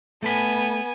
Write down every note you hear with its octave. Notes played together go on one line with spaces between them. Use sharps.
A3 B3 A4 G#5 B5